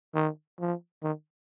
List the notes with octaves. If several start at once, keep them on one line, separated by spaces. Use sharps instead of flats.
D#3
F3
D#3